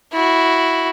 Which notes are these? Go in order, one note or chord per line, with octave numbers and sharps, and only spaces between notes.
E4 F#4